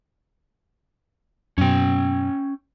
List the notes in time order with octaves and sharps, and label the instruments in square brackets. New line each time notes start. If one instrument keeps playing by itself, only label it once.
[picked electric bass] F#2 B2 [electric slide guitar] C#4 G5